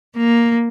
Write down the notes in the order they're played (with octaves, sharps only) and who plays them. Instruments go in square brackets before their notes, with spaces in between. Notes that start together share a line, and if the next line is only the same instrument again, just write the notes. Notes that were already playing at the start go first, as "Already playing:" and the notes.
[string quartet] A#3